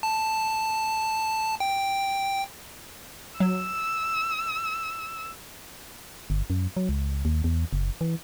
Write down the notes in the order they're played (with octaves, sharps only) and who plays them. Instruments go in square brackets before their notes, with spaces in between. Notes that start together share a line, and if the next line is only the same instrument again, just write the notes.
[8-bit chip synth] A5
G5
[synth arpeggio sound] F#3 [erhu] E6
[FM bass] G1
F#2
F#3
C#2
D#2
E2
F#1
E3